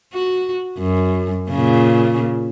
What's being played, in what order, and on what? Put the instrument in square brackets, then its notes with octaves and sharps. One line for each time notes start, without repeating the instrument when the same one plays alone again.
[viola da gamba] F#4
F#2
A#2 C#3